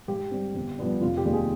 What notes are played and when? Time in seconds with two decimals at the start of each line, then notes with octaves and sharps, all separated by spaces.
0.08 G#2 G4
0.31 G3 C4
0.54 G1
0.78 G2 F3 B3 D4
1.01 F1 F4
1.17 G4
1.25 D#2 D#3 G#3 D4
1.33 G#4